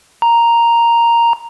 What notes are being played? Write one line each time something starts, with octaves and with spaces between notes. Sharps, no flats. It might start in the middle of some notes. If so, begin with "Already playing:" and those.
A#5